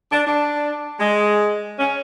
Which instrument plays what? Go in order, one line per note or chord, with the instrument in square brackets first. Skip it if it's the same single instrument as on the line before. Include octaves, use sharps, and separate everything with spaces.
[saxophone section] D4
D4
G#3
C#4